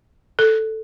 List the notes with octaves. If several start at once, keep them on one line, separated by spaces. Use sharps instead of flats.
A4